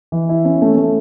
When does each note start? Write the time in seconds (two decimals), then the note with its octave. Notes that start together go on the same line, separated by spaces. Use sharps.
0.12 E3
0.29 E4
0.45 C#4
0.62 A3
0.77 A3